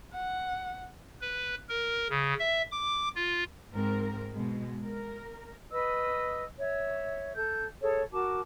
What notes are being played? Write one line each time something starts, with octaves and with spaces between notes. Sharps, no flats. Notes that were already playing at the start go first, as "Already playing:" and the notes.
F#5
B4
A#4
C#3
E5
D6
F4
G#2 C4 A#4
B2 G#3
A#4
B4 D#5 E6
C#5 E5
A4 G6
G#4 A4 C#5
F#4 A#4 A5 D6